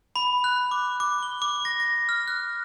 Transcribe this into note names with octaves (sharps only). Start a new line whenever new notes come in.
B5
F#6
D6
D6
G7
D6
A#6
A#6
F6
F#6